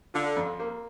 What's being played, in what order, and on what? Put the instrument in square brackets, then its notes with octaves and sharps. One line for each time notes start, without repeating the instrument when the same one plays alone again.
[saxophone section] D3 [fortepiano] F4
[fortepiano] F2
A#3